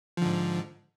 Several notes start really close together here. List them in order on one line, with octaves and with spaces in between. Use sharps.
F3 D3 G#2